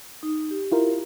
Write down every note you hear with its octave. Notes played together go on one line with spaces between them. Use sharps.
D#4
G4
E4 F4 A#4